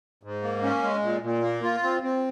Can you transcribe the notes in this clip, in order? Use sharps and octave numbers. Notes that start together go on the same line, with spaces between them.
G#2
A#3
C#4
G#3
A#2
A#2
A#3
F4
C4
C4